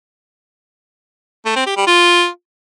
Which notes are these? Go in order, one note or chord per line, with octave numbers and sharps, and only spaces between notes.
A3
C4
G4
G3
F4